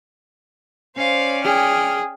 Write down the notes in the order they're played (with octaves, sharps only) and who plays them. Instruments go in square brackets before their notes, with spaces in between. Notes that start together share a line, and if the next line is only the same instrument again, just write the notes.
[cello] C#4 D5 [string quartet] C5 F5
[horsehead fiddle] G#4 [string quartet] G5 F6